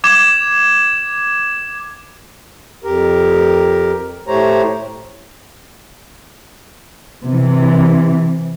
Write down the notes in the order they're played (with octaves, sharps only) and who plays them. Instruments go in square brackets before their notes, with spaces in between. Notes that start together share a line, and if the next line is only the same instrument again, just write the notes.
[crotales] D6 G#6 E7
[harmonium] F2 G4 A#4
A2 A3 G4 C5 C#5 A#5
[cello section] C3 E3